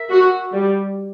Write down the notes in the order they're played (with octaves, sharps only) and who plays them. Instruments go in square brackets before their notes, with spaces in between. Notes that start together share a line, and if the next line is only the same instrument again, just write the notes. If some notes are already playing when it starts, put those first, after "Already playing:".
Already playing: [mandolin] A#4 E5
[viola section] F#4
G3